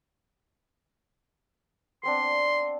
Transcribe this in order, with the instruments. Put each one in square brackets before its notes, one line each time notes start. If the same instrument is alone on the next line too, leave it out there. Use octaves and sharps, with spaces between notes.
[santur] B3 C4 D4 [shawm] C6